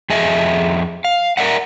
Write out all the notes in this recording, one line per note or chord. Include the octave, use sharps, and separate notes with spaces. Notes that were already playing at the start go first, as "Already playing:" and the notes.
F2 G#4 D#5 E5
F5
A#4 D5 E5 F#5